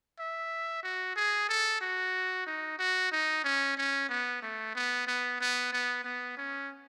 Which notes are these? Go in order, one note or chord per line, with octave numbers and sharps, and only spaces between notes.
E5
F#4
G#4
A4
F#4
D#4
F#4
D#4
C#4
C#4
B3
A3
B3
B3
B3
B3
B3
C#4